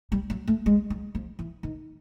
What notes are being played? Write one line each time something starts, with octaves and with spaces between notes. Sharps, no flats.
G3
F#3
A3
G#3
F#3
F3
E3
D#3